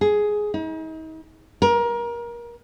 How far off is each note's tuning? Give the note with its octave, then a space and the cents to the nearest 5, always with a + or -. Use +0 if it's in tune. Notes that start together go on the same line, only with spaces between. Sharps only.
G#4 +10
D#4 +40
A#4 +25